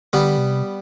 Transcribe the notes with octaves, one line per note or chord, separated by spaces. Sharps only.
D3 G3 B3
C3